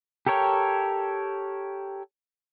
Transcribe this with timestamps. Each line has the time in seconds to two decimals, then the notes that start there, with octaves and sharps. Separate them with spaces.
0.26 G4 A4 A#4 C#5 G5